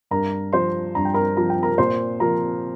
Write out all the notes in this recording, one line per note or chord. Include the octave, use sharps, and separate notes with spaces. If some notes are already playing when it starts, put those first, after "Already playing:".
G2 A#4 A#5
F3 C5 C6
G2 A#5
G5
A#4 A#5
F3 A#5
G5
A#4 A#5
A#2 C5 C6
F3 A#4 A#5